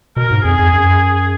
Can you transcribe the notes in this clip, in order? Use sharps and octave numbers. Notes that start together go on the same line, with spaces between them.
B2 A#4
G#2
F2 G#4
F2
F#2